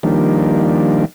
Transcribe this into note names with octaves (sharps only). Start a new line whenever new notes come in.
D#3 F3 G3 A#3 D4